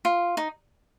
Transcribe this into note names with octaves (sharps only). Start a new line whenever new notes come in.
F4
D#4